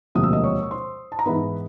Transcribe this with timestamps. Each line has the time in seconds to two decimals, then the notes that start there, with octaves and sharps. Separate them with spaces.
0.15 E1 D2 C3 F3 A#3 D#6
0.23 E6
0.33 D#5 D#6
0.44 C#5 C#6
0.63 C#6
0.71 C5 C6
1.12 A5
1.19 A#5
1.26 G#2 E3 G#3 B3 B4 B5